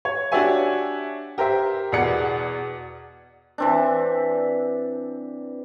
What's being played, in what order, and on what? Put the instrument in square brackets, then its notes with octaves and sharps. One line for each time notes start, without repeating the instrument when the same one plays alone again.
[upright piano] C#5
D4 F#4 G4 C#5 E5 G#5
G4 A#4 C5 E5
E2 B2 G#4 D5 F#5 C#7
[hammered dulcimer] E3 C4 D4